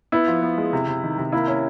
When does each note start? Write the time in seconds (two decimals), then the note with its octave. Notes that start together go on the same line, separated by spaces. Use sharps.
0.12 B3 E4
0.28 F3
0.42 B3
0.58 G#3
0.73 C3
0.88 C3
1.03 D#3
1.18 C3
1.32 A#3 E4
1.48 C#4